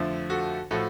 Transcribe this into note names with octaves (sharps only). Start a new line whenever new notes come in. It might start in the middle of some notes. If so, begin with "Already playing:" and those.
Already playing: F2 D3 F3 A3
F#4 A4
A2 F3 F#4 A4